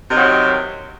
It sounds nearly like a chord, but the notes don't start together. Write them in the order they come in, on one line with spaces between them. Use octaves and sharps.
C3 D#3 F#3